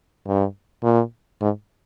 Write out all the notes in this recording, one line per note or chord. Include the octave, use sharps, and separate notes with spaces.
G2
A#2
G#2